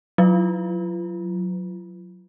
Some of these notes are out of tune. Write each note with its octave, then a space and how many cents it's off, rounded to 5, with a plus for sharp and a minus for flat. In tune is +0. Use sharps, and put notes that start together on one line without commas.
F#3 -20 F4 -40